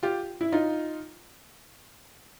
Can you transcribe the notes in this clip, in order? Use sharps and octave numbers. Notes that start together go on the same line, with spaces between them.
F4 G4
E4
D#4 F4